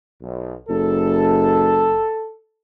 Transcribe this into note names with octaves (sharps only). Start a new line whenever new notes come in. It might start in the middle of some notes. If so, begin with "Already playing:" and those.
B1
F#1 A4